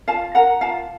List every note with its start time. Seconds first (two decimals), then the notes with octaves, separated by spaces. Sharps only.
0.08 F4 F5 A5
0.35 A#4 F#5 A#5
0.61 F4 F5 A5